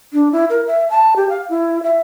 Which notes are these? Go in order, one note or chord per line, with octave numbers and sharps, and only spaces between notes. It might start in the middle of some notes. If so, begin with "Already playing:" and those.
D4
E4
A#4
E5
A5
G4
F5
E4
E5